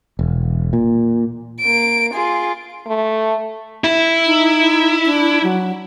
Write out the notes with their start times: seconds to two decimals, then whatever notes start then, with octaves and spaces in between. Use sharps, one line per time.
0.19 E1
0.73 A#2
1.60 A#3 D7
2.14 F4 G#4
2.87 A3
3.84 E4
4.26 D#4
5.06 D4
5.43 F#3